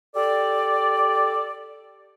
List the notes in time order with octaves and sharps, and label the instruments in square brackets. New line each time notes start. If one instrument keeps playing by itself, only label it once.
[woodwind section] G4 A4 D5